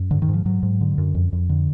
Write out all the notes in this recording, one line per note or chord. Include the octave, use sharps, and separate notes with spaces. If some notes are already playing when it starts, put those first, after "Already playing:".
Already playing: F#2
G#2 D3
D#3
G#2
F3
G#2 F#3
G#2
D3
F#2
F2
F2
D3